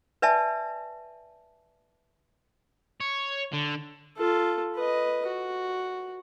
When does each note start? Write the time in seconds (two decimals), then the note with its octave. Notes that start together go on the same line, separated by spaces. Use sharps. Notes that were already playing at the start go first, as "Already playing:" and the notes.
0.22 B4 D5 E5 G#5 A5
3.01 C#5
3.53 D3
4.17 F4 A4
4.75 B4 D#5
5.27 F#4